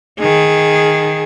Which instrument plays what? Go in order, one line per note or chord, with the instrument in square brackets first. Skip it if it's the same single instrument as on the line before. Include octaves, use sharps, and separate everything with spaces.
[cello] D#3 G#4